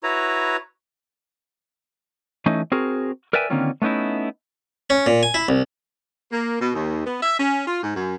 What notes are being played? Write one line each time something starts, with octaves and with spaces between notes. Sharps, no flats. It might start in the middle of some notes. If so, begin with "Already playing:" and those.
E4 F#4 B4 C#5 A#5
E3 A3 C#4 D#4
C4 F#4 G#4 A#4
A#4 B4 D5 E5 G5 G#5
D3 D#3 A#3 C4 C#4 F4
A3 B3 C#4 D#4 E4
C#4
A#2
G#5
E4
C2
A#3
B2
D#2
B3
E5
C#4
F4
G#2
F#2